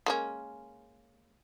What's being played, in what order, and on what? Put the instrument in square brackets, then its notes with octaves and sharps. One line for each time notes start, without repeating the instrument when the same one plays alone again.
[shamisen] G#3 A#3 C#4